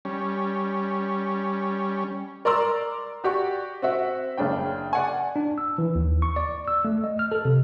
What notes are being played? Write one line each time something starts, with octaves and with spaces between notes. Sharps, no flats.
G3 C#4
A#4 D5 A#5 C6 E6
F#4 G4 D5 C#6
C4 F#4 E5
F#1 C#3 D4 G5
D5 F#5 G#5
D4
E6
E3
D#2
C#6
D5
E6
A3
D#5
F6
A4
C3